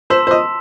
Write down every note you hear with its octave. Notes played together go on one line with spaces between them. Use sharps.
C5 A5 C6 E6 B6 E7
C5
D#5